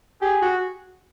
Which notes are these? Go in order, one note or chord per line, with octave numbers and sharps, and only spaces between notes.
G4 G#4
F#4